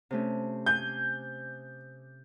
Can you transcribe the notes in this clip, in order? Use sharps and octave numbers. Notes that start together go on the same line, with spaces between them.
C3 A3 C#4
G#5 G6